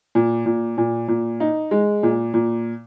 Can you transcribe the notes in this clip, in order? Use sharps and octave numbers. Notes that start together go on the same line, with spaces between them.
A#2
A#2
A#2
A#2
D#4
G#3
A#2
A#2